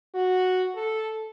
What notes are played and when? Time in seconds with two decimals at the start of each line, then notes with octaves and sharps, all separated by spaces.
0.15 F#4
0.76 A4